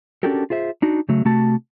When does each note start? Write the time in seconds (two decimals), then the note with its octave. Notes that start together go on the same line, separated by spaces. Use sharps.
0.23 C#4 D4 F#4 G4 A4 A#4
0.50 F4 G#4 C5 E5
0.82 D4 D#4 F#4
1.09 C#3 F#3 A3
1.25 C3 A3 F#4 A5